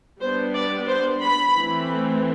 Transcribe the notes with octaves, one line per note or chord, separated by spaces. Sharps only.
G3 B3 D4 C5
D5
C5
B5
E3 A3 C4